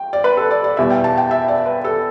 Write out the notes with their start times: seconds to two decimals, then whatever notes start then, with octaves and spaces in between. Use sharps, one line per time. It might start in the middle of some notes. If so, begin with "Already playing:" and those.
Already playing: G5
0.13 D5
0.24 B4
0.37 A4
0.51 D5
0.64 D5
0.77 E2 B2 G3 E5
0.91 G5
1.04 A5
1.17 G5
1.31 E5
1.48 D5
1.66 B4
1.84 A4